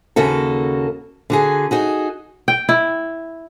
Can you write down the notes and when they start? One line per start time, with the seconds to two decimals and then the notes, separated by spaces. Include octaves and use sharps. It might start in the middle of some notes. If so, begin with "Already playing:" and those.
0.16 D#2 C#3 A#3 F#4 A4
1.30 D3 F#4 G#4
1.71 D#4 F#4 G#4
2.48 G5
2.69 E4